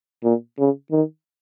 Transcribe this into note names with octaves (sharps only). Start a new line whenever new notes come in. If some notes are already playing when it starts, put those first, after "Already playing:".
A#2
C#3
D#3